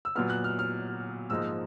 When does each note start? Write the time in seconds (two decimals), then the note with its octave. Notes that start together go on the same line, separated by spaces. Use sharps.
0.05 E6
0.15 A#2 F#3 B3 F6
0.30 F#6
0.44 F6
0.59 F6
1.30 G#2 F3 A#3 D#4 E6